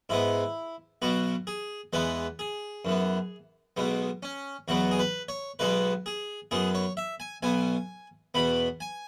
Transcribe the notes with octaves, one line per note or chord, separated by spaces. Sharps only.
G#2 G#3 B3 E4
B1 B2 B3 F#4
G#4
E2 E3 G#3 B3 B4
G#4
F#2 E3 B3
B1 B2 G#3 B3
C#4
E2 B2 F#3 B3 F#4
G#4
B4
C#5
B1 B2 G#3 B3 B4
G#4
F#2 F#3 B3 G#4
C#5
E5
G#5
B1 B2 B3 G#5
E2 B2 B3 B5
G#5